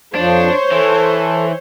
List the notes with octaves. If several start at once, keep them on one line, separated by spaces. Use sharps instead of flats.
F2 F3 D4 C5 C#5
E3 A4